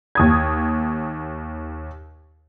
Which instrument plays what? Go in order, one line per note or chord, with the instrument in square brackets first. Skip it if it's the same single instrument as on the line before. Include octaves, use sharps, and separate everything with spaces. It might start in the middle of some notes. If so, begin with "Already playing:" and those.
[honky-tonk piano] D#2 D#6 G#6